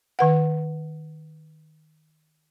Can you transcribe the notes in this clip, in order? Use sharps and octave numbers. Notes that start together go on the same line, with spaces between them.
D#3 B4 F#5